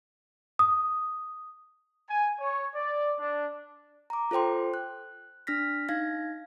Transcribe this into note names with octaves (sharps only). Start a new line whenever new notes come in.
D#6
G#5
C#5
D5
D4
A#5 D6
F4 A4 C5 G5 C6
F#6
D4 F6 A#6 B6
D#4 F5 G#6 A#6